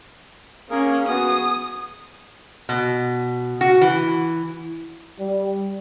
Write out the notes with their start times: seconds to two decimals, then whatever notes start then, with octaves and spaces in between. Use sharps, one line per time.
0.70 A#3 C#4 G#4 A#4
1.08 B3 F#4 G#4 D#6
2.69 B2
3.61 F#4
3.81 E3
5.19 G3